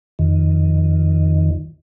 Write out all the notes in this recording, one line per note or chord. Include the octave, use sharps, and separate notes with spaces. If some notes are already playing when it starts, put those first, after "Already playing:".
F2 D#3